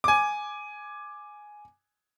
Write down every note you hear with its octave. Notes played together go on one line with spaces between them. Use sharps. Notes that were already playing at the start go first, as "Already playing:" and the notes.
G#5 D6